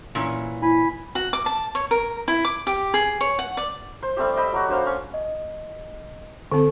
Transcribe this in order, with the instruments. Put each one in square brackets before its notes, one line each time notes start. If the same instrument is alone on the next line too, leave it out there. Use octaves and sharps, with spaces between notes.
[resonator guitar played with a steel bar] A#2 E3 C#4
[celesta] E4 [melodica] G#5 B5
[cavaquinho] F#4
D6
A5
C#5
A#4
E4
D6
G4
G#4
C#5
F#5
D5
[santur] C5
G3 A3 C4 G4
D#5 G5 B5 E6
F#3 F#4
D4 C5 F5
C#4
[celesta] D#5
[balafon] D3 C4 [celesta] A4